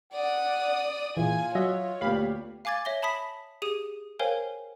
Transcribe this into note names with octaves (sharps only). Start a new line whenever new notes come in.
D5 F#5 D#6
A#2 E3 F4 G#4 E5 G#5
F#3 C#5 D#5 E5 F#5
D2 A#2 B3 G4 F5 B5
F5 G#5 D6 G#6 A6
C#5 E5 A#6 G7
A5 B5 D#6 B6
G4 G#4 D#6 D#7
A#4 C5 C#5 F5 G5 G#5